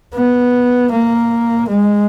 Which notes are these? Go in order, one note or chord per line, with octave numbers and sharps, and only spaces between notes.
B3
A#3
G#3